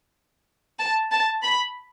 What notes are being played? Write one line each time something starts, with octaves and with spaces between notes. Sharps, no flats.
A5
A5
B5